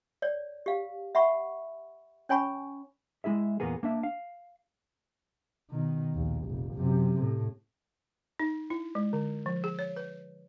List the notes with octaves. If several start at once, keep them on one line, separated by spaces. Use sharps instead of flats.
C#5 D5
G4 F5
E5 F#5 B5 C#6
C#4 C#5 G#5 B5 C#6
G#3 E4 G#4 E5
E2 A#2 A#3 B3 G#4
A#3 D4 E5
F5
B2 D#3
A#1 D#2
F1 A#1
F#2 C3
A2
D#4
E4
G#3
D3
F3
G#4
C#5
B4